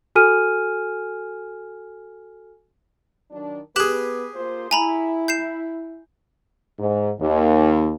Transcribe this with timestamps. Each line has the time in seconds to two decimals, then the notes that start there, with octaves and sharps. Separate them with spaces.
0.15 F#4 A4 G#5 F6 D#7
3.31 D#3 F#3 D4
3.76 B3 G4 G#4 B4 F#6 E7 F#7
4.35 A#3 F4 C5
4.71 E4 G#5 A#5 B5
5.28 G6 C7 E7
6.79 G#2
7.20 D#2